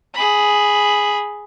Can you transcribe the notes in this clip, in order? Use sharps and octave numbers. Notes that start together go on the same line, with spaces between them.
G#4 B5